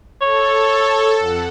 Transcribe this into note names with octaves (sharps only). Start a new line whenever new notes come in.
A4 C#5
F2 F#5